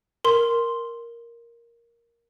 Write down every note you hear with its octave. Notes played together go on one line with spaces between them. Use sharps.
A#4 C6